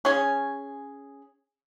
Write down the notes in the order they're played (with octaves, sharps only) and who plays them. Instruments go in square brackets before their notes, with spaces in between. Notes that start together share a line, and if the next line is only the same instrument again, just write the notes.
[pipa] C#4 G#4